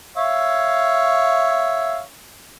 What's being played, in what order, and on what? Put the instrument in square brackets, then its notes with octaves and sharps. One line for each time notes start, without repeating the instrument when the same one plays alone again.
[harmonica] C#5 E5 F5